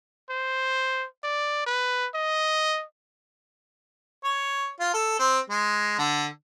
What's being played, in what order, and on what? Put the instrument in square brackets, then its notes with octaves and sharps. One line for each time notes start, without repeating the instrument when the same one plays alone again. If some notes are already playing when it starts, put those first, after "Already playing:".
[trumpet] C5
D5
B4
D#5
[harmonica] C#5
F4
A4
C4
G#3
D3